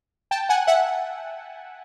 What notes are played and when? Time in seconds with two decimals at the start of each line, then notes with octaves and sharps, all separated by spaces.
0.31 G5 A5
0.49 F#5 G#5
0.67 E5 F#5